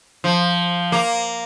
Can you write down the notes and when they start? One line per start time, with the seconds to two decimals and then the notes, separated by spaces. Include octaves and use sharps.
0.24 F3
0.92 A#3